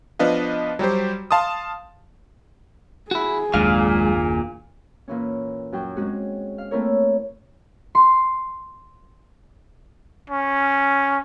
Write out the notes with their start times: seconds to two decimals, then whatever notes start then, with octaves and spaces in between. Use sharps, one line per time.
0.19 F3 B3 D4 B4 D#5 F5
0.79 F#3 G3 G4 C5
1.31 F5 A5 C6 D#6
3.11 E4 F#4 G#4
3.54 F#1 D#2 A#2 F#3 G#3 D4 F5
5.08 A#2 E3 C#4
5.72 F#2 F#3 G5 G6
5.96 G#3 C4 C#4 F#4 G#4
6.58 F5
6.71 A3 A#3 C4 E4 A#4 C#5
7.95 C6
10.30 C#4